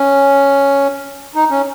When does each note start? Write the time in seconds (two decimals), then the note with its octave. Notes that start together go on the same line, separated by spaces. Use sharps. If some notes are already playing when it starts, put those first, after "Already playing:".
Already playing: C#4
1.35 D#4
1.51 C#4